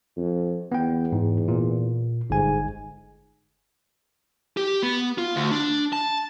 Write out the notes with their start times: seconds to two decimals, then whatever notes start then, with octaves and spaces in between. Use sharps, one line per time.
0.17 F2
0.72 E2 B3 G5
1.12 G#2
1.48 A#2
2.30 G1 G#2 G#5
4.57 G4
4.83 B3
5.18 F4
5.36 D2
5.51 D4
5.93 A5